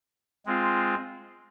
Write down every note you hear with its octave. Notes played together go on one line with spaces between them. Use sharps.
G#3 C4 F4